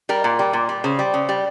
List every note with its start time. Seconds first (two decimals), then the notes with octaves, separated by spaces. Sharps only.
0.09 G3 A#4
0.24 A#2
0.39 G3
0.53 A#2
0.69 G3
0.84 C#3 C5
0.99 G3
1.14 C#3
1.29 G3